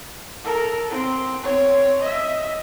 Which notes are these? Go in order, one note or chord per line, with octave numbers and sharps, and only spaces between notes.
A4 A#4
C4
C4 C#5
D#5 E5